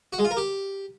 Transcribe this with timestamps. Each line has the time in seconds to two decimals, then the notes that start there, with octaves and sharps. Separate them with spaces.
0.13 F#4
0.19 G#3
0.25 F4
0.31 A#4
0.37 G4